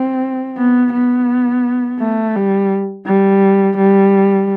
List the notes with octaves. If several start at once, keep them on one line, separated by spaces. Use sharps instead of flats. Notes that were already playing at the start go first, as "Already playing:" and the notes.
Already playing: C4
B3
B3
A3
G3
G3
G3